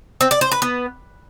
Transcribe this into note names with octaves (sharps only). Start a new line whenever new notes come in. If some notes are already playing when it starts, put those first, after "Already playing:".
C4
D5
C5
B4
B3